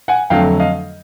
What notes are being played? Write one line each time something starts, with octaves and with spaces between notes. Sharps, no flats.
F#5 G#5
F2 D3 F#3 A3 F5 G5
D#5 F5